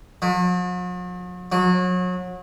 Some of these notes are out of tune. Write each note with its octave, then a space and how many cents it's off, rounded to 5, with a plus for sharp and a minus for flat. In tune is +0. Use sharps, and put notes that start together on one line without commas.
F#3 -45
F#3 -30